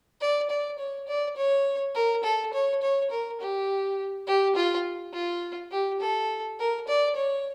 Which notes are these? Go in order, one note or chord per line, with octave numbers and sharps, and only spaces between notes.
D5
D5
C#5
D5
C#5
A#4
A4
C#5
C#5
A#4
G4
G4
F4
F4
G4
A4
A#4
D5
C#5